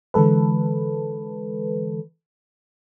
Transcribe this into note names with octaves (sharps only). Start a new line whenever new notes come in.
D3 E3 G#3 A4 B4